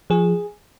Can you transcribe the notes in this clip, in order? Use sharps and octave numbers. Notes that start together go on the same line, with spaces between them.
F3 G#4